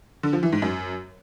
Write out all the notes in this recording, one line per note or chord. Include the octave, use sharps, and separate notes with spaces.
D3
F3
E3
G#2
F#2